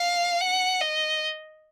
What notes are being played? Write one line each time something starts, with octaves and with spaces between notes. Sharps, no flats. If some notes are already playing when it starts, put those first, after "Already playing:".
Already playing: F5
F#5
D#5